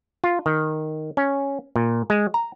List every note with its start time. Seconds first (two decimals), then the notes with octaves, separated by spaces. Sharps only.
0.24 F4
0.46 D#3
1.17 C#4
1.76 A#2
2.10 G#3
2.34 A#5